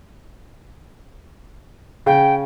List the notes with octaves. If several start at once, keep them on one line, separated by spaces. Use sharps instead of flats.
C#3 G5